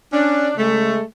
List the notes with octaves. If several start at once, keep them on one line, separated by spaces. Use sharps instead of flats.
C#4 D4
C#3 G#3 A3